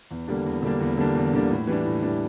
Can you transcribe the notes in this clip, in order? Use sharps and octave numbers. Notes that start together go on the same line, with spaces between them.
E2
D3 G3 A#3 D4
E2
D3 G3 A#3 D4
E2
D3 G3 A#3 D4
E2
D3 G3 A#3 D4
A2
E3 G3 D4
A2
E3 G3 D4